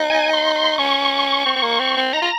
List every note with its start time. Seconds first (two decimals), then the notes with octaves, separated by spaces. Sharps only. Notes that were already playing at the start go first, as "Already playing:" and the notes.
Already playing: D#4
0.10 G#5
0.33 C6
0.56 C6
0.78 C#4 C#6
1.45 C4
1.56 C4
1.62 A#3
1.79 C4
1.97 C4
2.13 D#4 A#5
2.22 F4